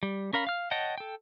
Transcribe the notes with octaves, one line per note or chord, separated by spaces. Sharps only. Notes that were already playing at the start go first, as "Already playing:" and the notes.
G3
C#4 A#4 F5 B5
F5 F6
C#5 D#5 F#5 G5 A5
A4 G5